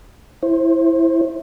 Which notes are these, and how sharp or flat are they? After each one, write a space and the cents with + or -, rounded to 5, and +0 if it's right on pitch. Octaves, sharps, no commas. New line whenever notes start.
E4 +0 C5 +25